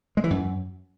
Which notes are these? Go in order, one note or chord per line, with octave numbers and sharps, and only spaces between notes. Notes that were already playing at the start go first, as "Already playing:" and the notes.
G#3
E3
F#2